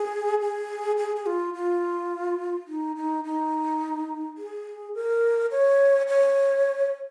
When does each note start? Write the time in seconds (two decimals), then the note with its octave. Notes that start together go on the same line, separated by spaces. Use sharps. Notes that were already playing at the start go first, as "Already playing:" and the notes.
Already playing: G#4
0.41 G#4
0.98 G#4
1.16 G#4
1.26 F4
1.54 F4
2.68 D#4
2.96 D#4
3.24 D#4
4.38 G#4
4.95 A#4
5.51 C#5
6.08 C#5